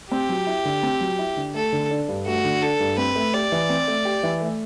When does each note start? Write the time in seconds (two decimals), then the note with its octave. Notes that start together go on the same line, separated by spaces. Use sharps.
0.11 C4 G4
0.29 F#3
0.47 E4
0.65 D3
0.83 C4
1.00 F#3
1.19 E4
1.37 D3
1.54 A3 A4
1.73 D3
1.91 D4
2.09 G2
2.27 A3 F#4
2.44 D3
2.62 D4 A4
2.80 G2
2.98 C4 B4
3.16 A3
3.34 G4 D5
3.52 E3
3.70 C4
3.88 A3
4.05 G4
4.23 E3
4.41 A3